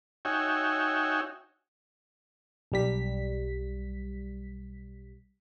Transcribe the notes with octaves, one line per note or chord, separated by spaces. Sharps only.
D#4 F#4 C#5 E5 G5 G#5
B1 G3 B6